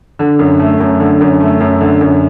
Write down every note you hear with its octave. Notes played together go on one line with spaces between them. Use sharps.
D3
F#2
A3
F#2
D3
F#2
A3
F#2
D3
F#2